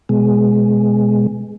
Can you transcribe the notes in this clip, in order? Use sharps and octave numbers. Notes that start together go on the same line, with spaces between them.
B2 G#3